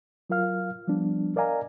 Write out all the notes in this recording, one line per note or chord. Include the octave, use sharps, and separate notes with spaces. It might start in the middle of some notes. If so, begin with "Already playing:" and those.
F#3 F4 A#4 F5 F6
F3 G3 B3 D4
A#4 D5 D#5 F5 G#5 A#5